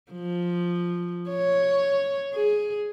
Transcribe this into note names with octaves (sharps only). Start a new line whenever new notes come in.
F3
C#5
G#4